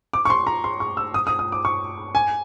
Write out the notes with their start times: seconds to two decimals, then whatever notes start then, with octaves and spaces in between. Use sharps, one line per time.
0.13 D6
0.25 C#6
0.30 C6
0.47 A#5
0.64 C6
0.80 C#6
0.97 E6
1.14 D#6
1.27 D#6
1.39 D#6
1.52 D6
1.65 C#6
2.15 G#5